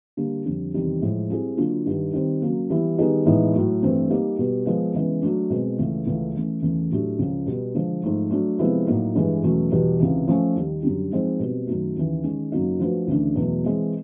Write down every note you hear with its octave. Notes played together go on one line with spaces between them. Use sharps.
D3 G3 A#3
F2 D3 G3
E2 C3 D#3 G3
A2 F3 G#3
G3 C4 E4 G#4
D3 F#3 A#3 D4 F4
G2 D#3 G3
D#3 G3 C4
C#3 F#3 A#3
E3 G3 B3 E4
D#3 G3 B3 D#4 G#4
A2 E3 G#3 B3 D#4
A2 F#3 A3
G2 E3 A3 C4
G3 A#3 D#4
B2 G3 B3
F3 G#3 B3
C#3 E3 G#3 B3
F#3 A3 D4
B2 G#3 C4
C#2 C#3 E3 A3
C#2 C#3 E3 A3
E3 A3 C#4
E2 C#3 E3 A3
A2 F#3 A3 D4 G4
C#2 C#3 F3
B2 G3 B3
D3 F3 G#3
G#2 F3 A3
F#3 A3 D4
C3 F3 G#3 B3 E4
A2 F#3 A#3 D#4 F#4
G2 E3 G#3
E2 B2 F#3 A3 C#4
E2 B2 G3
C#2 C3 E3
F3 A3 C#4
D#2 D#3 G3
F#2 D3 G3
F3 G#3 C4 D#4
B2 G3 C4
F#2 D#3 F#3 A3
D#2 C#3 E3
D#3 G#3 C#4
F#2 C#3 F#3 A#3 D#4
F3 A3 D4 F#4 B4
D2 C#3 E3 A3 D4
E2 B2 F#3 A3
E3 G#3 C4